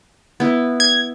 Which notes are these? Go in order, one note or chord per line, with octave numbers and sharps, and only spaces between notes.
B3 E4
G#6